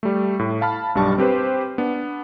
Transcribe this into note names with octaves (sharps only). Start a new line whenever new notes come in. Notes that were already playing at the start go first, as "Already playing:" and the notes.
G3 A3
A2
F5 A5 B5 F6
B1 G2 G3 A5 C#6
C4 G4 B4 C5
B3 D4